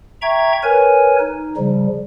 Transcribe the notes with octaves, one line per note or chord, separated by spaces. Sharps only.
E5 G5 A#5 C#6 G#6
A#4 B4 C#5 G#5
D#4
C#3 F3 G3